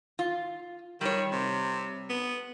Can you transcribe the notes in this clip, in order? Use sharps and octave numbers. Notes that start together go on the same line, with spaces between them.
F4
D#3 G3 C#5
C3
B3